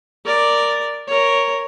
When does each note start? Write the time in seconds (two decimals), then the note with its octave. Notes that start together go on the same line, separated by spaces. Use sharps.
0.25 A#4 D5
1.07 A#4 C#5